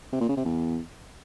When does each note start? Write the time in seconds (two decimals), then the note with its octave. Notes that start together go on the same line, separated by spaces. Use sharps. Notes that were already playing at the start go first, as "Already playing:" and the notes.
0.13 C3
0.21 A#2
0.29 C#3
0.37 C3
0.45 E2